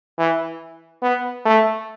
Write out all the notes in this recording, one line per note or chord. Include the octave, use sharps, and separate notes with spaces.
E3
B3
A3